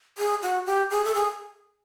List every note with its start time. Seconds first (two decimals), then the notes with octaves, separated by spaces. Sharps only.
0.18 G#4
0.42 F#4
0.66 G4
0.90 G#4
1.05 A4
1.15 G#4